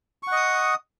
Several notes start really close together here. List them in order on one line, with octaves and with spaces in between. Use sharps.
C#6 F#5 D#5 D#6